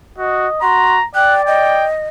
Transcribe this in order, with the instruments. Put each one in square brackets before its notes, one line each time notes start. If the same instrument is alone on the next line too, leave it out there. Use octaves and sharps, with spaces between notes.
[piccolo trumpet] F#4 [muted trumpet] D#5
[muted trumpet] F#4 [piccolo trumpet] A#5 [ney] C6
[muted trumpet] D5 [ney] G5 [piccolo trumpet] F#6
[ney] D#5 [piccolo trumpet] G5